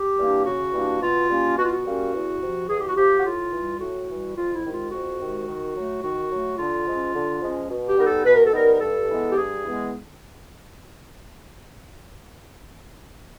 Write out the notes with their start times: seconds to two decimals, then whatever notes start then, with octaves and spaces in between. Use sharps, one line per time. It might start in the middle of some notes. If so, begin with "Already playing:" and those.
Already playing: G4
0.18 E3 G3 A#3 D4
0.45 C#3 F#4
0.73 E3 G3 A#3 D4
1.01 B2 F4
1.29 G3 A#3 C#4
1.57 B2 F#4
1.65 F4
1.72 F#4
1.85 G3 A#3 C#4
2.13 E2
2.40 C3 F3
2.68 E2 G#4
2.78 G4
2.87 F#4
2.96 C3 F3 G4
3.18 F#4
3.24 A2 F4
3.52 E3 G3
3.79 A2 F#4
4.08 E3 G3
4.35 F2 F4
4.54 E4
4.64 C3 D#3 G#3
4.72 F4
4.91 F2 F#4
5.19 C3 D#3 G#3
5.47 D#3
5.75 F#3 A3
6.03 D#3 F#4
6.30 F#3 A3
6.58 D3 F4
6.86 F3 G#3 C#4
7.14 D3
7.42 F3 G#3 C#4
7.69 B2
7.88 G4
7.97 G3 B3 D#4 A#4
8.06 A4
8.25 B2 B4
8.35 A#4
8.45 A4
8.53 G3 B3 D#4 A#4
8.73 A#4
8.81 G2 A4
9.09 E3 G#3 B3
9.31 G4
9.36 G2 G#4
9.64 E3 G#3 B3